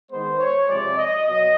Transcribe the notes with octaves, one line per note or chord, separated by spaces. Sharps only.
D#3 G#3 B3 C5
C#5
C3 F3 G#3 D5
D#5
B2 F#3 D#5